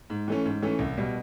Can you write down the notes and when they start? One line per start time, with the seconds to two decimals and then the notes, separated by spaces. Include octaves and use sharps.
0.10 G#2
0.28 E3 A3 C#4
0.45 G#2
0.62 E3 A3 C#4
0.79 C2
0.97 B2 G3